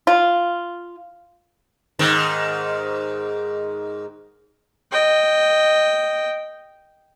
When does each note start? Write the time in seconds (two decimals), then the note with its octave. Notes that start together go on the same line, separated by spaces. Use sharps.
0.07 F4
1.99 G#2 D#3
4.92 D#5 G5